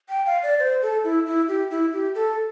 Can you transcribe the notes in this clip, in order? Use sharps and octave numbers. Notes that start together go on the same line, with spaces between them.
G5
F5
D5
C5
A4
E4
E4
G4
E4
G4
A4